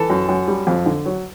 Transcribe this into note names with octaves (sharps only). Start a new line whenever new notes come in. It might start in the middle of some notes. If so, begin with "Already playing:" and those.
Already playing: E3 A4
F#2
F#2
G3
F2
D3
F#3